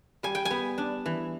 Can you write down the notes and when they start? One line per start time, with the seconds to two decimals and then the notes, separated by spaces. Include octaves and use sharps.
0.23 G3 G#5
0.35 G5
0.45 G#5
0.51 B3
0.78 D4
1.06 E3